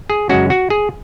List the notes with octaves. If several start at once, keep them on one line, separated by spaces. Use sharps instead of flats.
G#4
F#2 C#3 G#3 C#4 F#4
F#4
G#4